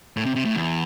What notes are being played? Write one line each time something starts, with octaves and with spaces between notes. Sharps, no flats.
A2
C3
C3
A2
E2